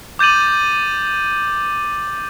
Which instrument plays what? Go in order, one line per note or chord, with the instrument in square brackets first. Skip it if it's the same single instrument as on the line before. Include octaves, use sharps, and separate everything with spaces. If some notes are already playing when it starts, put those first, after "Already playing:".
[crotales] D6 G6 A6 D#7 F#7